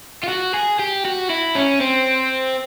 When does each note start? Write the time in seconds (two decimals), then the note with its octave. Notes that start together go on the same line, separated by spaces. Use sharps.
0.24 F4
0.29 F#4
0.54 G#4
0.79 G4
1.05 F#4
1.30 E4
1.55 C#4
1.81 C4